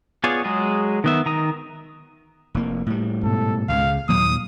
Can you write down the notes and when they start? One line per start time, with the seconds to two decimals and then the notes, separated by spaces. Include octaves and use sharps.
0.24 B3 F4 G#4 C#5 D5
0.45 F#3 G#3 G#4
1.04 D#3 B3 E5
1.26 D#3 A#5 D#6
2.54 F1 A#3
2.86 A2 G3
3.23 G#2 B2 A4
3.69 C#2 C#3 F5
4.09 D#2 A#2 F#3 A#3 D#6